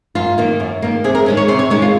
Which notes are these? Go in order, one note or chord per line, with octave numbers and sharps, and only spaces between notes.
F#2 F4
D#3 A#3
F#2
D#3 A#3
C3 G#4
A#4
D#3 G#3 C#4
C#5
C3 C5
C#5
D#3 G#3 C#4 C#5
F4